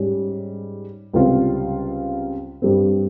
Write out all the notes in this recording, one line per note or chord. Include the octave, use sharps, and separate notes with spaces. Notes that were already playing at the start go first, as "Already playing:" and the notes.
Already playing: G#2 G3 C#4
C#2 C3 G3 C4 F4
G2 G3 C4